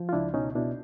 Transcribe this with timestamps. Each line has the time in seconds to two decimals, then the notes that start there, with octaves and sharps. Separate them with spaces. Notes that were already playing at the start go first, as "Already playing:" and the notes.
Already playing: F3
0.09 F4
0.13 C#2 D4 E4
0.34 B2 C#4 D#4
0.55 B2 D4 E4